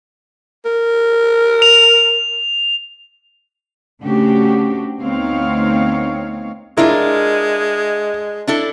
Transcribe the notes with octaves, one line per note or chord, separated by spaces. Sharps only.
A#4
F7
C#3 A3 C4 D4 F#4 G4
D2 B3 C4 D#4 C#5 F5
G#3 D4 E4 F4 A#4
D4 E4 A4